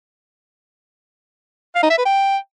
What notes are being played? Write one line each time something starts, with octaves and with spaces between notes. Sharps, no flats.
F5
D#4
E5
B4
G5